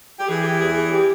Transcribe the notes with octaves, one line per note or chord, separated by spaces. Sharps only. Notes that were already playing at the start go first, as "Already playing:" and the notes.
G4
E3 G#4
G4
E2 G#4
G#4
G4